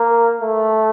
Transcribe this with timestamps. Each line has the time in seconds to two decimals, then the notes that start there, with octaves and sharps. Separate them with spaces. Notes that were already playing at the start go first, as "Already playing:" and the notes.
Already playing: A#3
0.41 A3